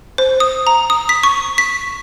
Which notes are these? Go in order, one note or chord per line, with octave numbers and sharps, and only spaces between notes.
C5
D#6
A#5
D#6
B6
C#6
B6